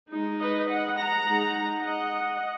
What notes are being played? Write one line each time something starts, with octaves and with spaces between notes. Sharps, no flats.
G#3 D#4
B4 D#5
D#5 F#5
F#5 A#5
G#3 D#4
D#5 F#5